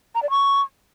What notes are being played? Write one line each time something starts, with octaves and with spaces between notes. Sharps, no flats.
A#5
D5
C#6